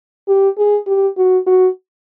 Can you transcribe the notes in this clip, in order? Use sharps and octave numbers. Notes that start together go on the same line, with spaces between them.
G4
G#4
G4
F#4
F#4